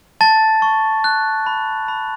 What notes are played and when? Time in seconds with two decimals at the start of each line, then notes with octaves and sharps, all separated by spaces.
0.21 A5 A6
0.62 C#6
1.04 F#6
1.46 B5
1.88 B5